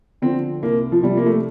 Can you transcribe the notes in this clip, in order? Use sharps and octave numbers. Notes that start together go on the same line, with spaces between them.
D3 F3 C4
C2 A#3
F3
C3 F3 G3
A#3
A3